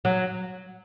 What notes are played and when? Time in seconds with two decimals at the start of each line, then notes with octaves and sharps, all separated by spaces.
0.05 F#3